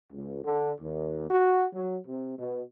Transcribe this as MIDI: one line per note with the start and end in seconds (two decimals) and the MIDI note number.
0.11 0.39 37
0.43 0.72 50
0.81 1.25 39
1.30 1.66 66
1.73 1.96 54
2.06 2.35 48
2.38 2.62 47